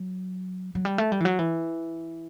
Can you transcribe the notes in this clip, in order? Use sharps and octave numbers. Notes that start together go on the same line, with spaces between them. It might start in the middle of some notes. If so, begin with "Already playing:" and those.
Already playing: F#3
F#3
G3
A3
G3
E3
F#3
E3